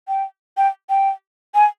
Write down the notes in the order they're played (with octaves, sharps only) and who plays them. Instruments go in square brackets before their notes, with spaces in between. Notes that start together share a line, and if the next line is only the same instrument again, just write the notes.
[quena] G5
G5
G5
G#5